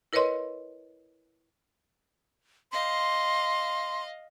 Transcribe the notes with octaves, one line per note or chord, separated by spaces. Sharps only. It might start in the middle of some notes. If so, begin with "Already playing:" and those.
E4 A#4 B4 C#5 D#5 C6
D#5 F5 C6